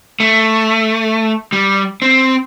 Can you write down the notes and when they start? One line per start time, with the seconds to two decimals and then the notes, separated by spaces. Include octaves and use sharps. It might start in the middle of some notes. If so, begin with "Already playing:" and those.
0.20 A3
1.53 G3
2.02 C4